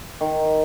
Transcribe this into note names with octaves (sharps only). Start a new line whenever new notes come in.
D#3